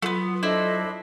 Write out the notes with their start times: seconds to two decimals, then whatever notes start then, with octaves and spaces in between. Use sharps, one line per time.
0.02 F#3 A3 B3 F4 C6
0.43 D4 E4 A4 C5 D#5